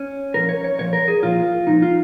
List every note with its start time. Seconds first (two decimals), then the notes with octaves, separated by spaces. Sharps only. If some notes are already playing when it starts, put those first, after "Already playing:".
Already playing: C#4
0.34 A#2 F3 A#4
0.49 C#5
0.64 C#5
0.79 A#2 F3 C#5
0.93 A#4
1.08 G#4
1.23 A#2 F3 F4
1.67 A#2 F3 D#4
1.82 F4